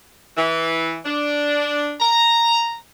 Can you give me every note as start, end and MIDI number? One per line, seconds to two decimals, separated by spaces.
0.37 0.98 52
1.05 1.94 62
2.00 2.76 82